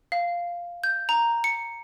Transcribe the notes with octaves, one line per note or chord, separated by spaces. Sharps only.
F5
G6
A#5
C#7